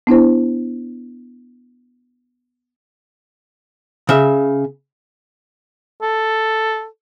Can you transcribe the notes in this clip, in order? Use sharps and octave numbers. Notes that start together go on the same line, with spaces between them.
B3 D4 E4 C5
C#3 E5
A4